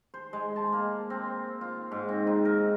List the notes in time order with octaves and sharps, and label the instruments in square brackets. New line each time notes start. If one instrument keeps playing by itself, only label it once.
[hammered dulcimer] C5
G#3
A5
A#3
C4
F4
G#2
C4
D#4
A#4